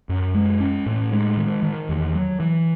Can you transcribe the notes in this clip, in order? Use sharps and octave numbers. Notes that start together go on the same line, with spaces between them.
F#2
G#3
C#4
A2
G#3
D#3
D#3
E2
F#3
E3